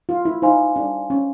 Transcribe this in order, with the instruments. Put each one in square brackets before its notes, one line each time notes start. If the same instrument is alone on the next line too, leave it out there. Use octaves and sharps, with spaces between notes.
[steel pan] F4
E4
[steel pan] D#4 [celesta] C5 F5 G#5 C6
[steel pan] D4
C#4